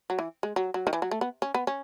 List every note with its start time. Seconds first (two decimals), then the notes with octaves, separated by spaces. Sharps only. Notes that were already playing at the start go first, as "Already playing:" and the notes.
0.10 F#3
0.19 E3
0.43 G#3
0.56 F#3
0.74 F#3
0.87 D#3
0.93 E3
1.02 F#3
1.11 A3
1.21 B3
1.42 C#4
1.54 B3
1.67 C#4